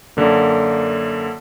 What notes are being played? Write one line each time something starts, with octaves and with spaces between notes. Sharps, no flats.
F#2 D3 A#3